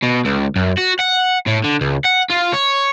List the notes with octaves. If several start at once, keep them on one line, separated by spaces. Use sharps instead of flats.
B2
C#2
F#2
F#4
F#5
A2
D3
C#2
F#5
F4
C#5